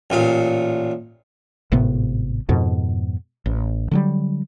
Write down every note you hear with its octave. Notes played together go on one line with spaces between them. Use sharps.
A1 A#2 F5
G#1 A2 C3 B3
F2 G#2 B2 F3
A1
D3 F#3 G3